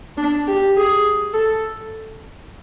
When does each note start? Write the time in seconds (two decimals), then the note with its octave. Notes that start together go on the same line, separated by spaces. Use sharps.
0.17 D4
0.48 G4
0.77 G#4
1.34 A4